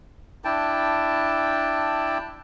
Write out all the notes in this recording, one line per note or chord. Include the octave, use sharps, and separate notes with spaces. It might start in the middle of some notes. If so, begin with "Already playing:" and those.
D4 E4 G5 A5